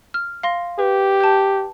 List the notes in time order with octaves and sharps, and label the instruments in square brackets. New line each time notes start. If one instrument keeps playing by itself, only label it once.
[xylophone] F6
F5 C6 A#6
[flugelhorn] G4 [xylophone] B4
[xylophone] A5 G6